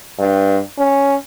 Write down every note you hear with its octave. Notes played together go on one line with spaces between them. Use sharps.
G2
C#4